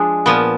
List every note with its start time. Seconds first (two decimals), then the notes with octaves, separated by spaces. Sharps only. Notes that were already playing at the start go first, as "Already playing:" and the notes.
Already playing: F3 G#3 D4 G#4
0.26 A#2 F3 B3